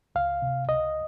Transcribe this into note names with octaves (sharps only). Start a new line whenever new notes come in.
C#2 F5
C3
C#2 D#5